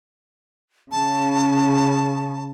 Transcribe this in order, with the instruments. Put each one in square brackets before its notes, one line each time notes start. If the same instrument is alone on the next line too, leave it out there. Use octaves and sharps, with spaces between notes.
[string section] C#3 [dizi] A5